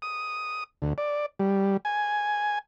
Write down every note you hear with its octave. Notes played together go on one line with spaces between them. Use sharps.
D#6
D2
D5
G3
G#5